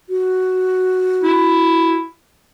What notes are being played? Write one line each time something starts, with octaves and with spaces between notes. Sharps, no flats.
F#4
E4